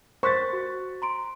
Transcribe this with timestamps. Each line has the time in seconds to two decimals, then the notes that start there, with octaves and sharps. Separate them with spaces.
0.23 A#4 C5 C#6 F#6 A6 B6
0.53 F#4
1.02 A#5 C6 D7